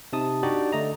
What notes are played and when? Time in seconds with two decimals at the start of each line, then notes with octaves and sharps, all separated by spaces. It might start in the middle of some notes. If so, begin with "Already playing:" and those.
0.13 C3 D#4 A5 D#6
0.43 D4 D#4 F#4 G4 D5 D#5
0.73 D3 A3 D#5 A#5